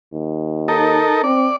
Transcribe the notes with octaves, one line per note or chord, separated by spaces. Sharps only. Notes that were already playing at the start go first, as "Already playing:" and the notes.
D#2
D#4 A4 A#4
C4 D5